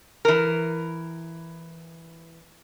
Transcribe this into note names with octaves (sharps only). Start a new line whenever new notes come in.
E3 A#4